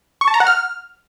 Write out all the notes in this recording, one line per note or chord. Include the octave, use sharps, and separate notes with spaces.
C#6
A5
A#5
F#5
F6